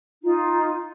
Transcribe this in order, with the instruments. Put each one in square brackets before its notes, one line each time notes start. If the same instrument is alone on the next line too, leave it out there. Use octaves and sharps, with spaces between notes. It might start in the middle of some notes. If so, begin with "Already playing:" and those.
[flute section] D#4 F4